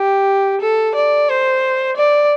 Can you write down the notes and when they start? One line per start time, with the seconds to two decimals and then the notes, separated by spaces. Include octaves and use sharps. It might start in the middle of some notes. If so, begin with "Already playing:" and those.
Already playing: G4
0.61 A4
0.95 D5
1.29 C5
1.97 D5